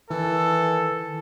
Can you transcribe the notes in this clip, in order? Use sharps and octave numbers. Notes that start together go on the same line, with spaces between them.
D#3 E3 A4